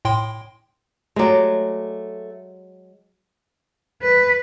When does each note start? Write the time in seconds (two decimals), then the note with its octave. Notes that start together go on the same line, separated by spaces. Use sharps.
0.05 A2 G5 C6
1.16 F#3 G#3 A3 D5
4.02 B4